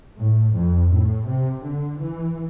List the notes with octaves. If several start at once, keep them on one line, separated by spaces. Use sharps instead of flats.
A2
F2
A2
C3
D3
E3